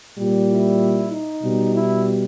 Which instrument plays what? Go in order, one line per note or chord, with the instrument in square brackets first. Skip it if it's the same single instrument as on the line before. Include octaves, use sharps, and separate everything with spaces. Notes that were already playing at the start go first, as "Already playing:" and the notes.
[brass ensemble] A#2 G3
E4
D#4
B2 G3
E4